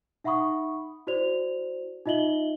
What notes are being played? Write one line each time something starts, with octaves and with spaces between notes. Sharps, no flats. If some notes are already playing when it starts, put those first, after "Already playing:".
D#4 E5 F#5 B5 C#6 D#6
E4 F#4 C5 D5 F7
D#4 F4 D#5 E5 F#7 G7